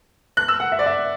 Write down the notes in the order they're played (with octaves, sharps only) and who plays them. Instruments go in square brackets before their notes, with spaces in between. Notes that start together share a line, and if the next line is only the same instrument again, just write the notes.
[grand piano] F#6
E6
F#5
E5
D5
E5